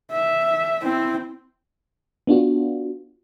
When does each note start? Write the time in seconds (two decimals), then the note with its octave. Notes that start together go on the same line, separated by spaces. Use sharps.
0.11 E5
0.83 C4 E4
2.27 B3 D4 F4 F#4